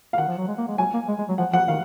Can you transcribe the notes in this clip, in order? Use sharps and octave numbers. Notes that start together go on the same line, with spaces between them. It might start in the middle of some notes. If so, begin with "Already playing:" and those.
F5
D#3 F#5
F3
F#3
G#3
A#3
G#3
F#3 G#5
A#3
G#3
G#3
F#3
F3 F#5
F3 F#5
D#3 F5